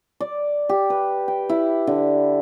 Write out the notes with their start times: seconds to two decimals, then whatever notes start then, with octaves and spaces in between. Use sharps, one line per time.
0.20 D5
0.69 G4
0.90 B4
1.28 G5
1.49 E4
1.87 D3